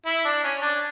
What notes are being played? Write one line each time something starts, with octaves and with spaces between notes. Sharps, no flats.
E4
D4
C#4
D4